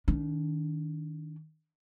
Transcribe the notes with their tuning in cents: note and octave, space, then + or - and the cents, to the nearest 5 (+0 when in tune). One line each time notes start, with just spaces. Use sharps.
D#3 +5 D4 -35